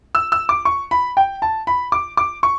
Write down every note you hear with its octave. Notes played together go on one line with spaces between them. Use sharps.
E6
E6
D6
C#6
B5
G5
A5
B5
D6
D6
C#6